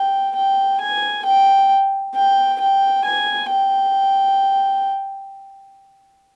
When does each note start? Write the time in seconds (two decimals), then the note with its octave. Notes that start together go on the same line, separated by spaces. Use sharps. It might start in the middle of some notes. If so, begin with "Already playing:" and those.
Already playing: G5
0.35 G5
0.81 G#5
1.25 G5
2.15 G5
2.60 G5
3.05 G#5
3.50 G5